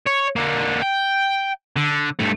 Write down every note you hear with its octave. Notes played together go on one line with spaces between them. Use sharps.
C#5
D3 A#3
G5
D3
G2 A3